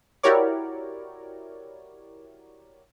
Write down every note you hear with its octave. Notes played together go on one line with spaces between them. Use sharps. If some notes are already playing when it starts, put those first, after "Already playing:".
E4 F#4 G4 A#4 C#5 D5